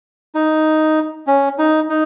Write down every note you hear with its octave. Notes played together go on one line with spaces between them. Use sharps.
D#4
C#4
D#4
D#4